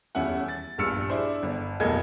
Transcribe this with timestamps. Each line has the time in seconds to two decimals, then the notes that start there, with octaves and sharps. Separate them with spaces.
0.15 D#1 E2 C#4 E4 F#5
0.48 A6
0.78 A#1 E2 G2 E6 F6 C#7
1.09 D4 E4 G#4 C5 D5
1.43 G1
1.80 F1 B1 A#2 A4 D#5 G#6